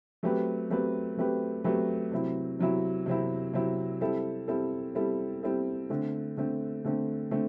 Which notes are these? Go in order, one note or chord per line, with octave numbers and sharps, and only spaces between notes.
F#3 A3 C4 G4 B4
F#3 A3 C4 G4 B4
F#3 A3 C4 G4 B4
F#3 A3 C4 G4 B4
C3 F#3 C4 E4
C3 F#3 C4 E4
C3 F#3 C4 E4
C3 F#3 C4 E4
G3 C4 E4 A4
G3 C4 E4 A4
G3 C4 E4 A4
G3 C4 E4 A4
D3 A3 C4
D3 A3 C4
D3 A3 C4
D3 A3 C4